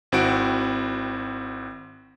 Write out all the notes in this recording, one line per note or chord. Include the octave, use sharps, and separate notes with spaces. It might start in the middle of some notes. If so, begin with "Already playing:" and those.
G#1 C4 E4 F#4 D7